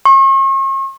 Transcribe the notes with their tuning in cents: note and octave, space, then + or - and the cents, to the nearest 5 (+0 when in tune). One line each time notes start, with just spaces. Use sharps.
C#6 -45